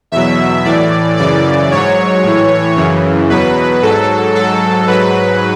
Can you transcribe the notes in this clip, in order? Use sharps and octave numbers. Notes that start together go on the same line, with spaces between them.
E2 B2 F#3 E5
A2 E3 D5
F#2 C#3 E3 D5
G#2 F#3 C#5
A2 E3
F#2 C#3 E3
E2 B2 F#3 B4
G#2 F#3 A4
G#2 F#3 A4
G#2 F#3 B4